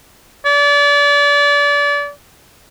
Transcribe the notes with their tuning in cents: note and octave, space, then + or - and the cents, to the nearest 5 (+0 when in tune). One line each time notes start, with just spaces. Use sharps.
D5 -30